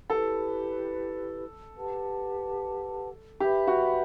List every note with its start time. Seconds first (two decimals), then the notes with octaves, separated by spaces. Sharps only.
0.10 E4 G4 A4 B4
1.75 G4 B4 F#5 A5
3.40 G4 B4 E5 B5
3.67 F#4